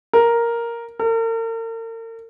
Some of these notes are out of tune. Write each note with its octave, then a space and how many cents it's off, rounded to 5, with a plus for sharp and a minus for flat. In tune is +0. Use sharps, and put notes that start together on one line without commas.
A#4 +0
A#4 -45